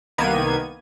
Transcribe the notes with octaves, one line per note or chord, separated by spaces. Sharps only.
C2 D#3 A#3 B3 G#6 D#7